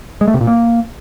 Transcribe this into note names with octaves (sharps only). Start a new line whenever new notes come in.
G#3
A3
C3
A#2
A#3